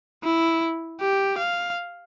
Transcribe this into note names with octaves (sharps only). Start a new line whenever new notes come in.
E4
G4
F5